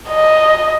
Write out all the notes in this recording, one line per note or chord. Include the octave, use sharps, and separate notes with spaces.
D#5